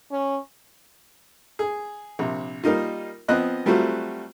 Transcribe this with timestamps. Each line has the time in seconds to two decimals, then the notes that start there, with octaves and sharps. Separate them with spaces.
0.11 C#4
1.59 G#4
2.19 A#1 C3
2.64 G3 A#3 D#4 F4
3.28 F3 B3 C4 D#5 F#6
3.66 F#3 G3 A3 C4 F4 F#4